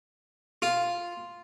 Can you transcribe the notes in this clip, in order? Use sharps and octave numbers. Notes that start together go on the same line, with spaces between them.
F4